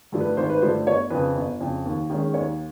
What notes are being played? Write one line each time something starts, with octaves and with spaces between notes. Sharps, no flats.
G2 D3 F3 A3
B4
G#1 C5
B4
G2 D3 F3 A3 C5
G1 C#5
F2 C#3 B4
G1
F2 C#3
D#2
D#3 G#3 C#4
D#2 C#5